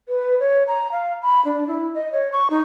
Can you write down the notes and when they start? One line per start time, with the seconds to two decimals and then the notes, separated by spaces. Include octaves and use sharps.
0.08 B4
0.40 C#5
0.68 A#5
0.92 F5
1.22 B5
1.45 D4
1.68 E4
1.95 D#5
2.13 C#5
2.32 C#6
2.50 D#4